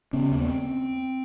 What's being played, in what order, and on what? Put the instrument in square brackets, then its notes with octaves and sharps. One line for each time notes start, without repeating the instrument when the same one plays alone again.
[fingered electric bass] C#3 B3 C#4
D#2 A#3
B3
C4